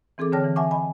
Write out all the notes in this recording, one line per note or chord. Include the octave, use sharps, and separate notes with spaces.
E3 C4 G#4 A4 D6
D3 C#5 G5 A5 F6 A#6
E3
E5 F#5 G#5 A5 C#6 D6
D#5 G#5 B5